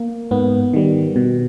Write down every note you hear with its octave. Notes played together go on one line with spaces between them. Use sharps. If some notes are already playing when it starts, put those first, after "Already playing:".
Already playing: A#3
G#2 B3
D#3 G3
B2